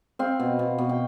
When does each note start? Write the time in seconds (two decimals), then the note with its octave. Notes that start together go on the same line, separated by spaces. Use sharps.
0.19 C4 F5
0.40 B2
0.59 B2
0.78 B2
0.89 G5